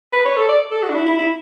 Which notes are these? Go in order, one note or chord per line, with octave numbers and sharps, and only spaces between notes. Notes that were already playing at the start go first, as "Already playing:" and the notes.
B4
C#5
A4
D5
A4
F#4
D4
E4
E4
E4